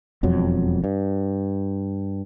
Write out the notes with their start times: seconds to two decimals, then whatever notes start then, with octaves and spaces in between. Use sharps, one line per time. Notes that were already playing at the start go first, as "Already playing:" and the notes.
0.23 E1 F2 F#3
0.84 G2